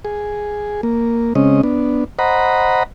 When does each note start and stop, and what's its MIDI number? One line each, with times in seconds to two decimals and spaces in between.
0.05 0.81 68
0.83 1.33 58
1.35 1.61 49
1.35 1.61 56
1.35 1.61 60
1.35 1.61 61
1.35 1.61 75
1.63 2.04 59
1.63 2.04 62
2.19 2.83 72
2.19 2.83 75
2.19 2.83 78
2.19 2.83 82
2.19 2.83 83